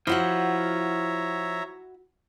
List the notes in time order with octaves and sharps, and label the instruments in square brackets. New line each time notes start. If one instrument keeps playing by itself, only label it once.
[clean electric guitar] F3 [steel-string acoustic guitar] E4 F#4 F#5 [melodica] C#5 E5 A#5